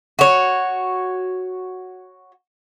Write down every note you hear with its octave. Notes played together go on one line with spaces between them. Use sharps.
F#4 C#5